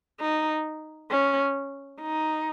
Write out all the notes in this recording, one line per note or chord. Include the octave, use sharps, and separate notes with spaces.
D#4
C#4
D#4